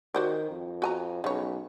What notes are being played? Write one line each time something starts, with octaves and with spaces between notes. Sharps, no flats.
D#3 F#4 C5 D5
F2
F#4 G#5 A#5
B1 C#3 C#5